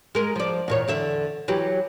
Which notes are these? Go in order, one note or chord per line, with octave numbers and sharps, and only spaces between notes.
G#3 A#4
F3 D5
E2 A#2 C#5
E2 D3 E5
E3 F#3 G4